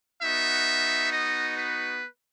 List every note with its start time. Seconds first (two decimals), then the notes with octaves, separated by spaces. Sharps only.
0.21 B3 D#4 F#4 E5
1.12 D#5
1.57 B4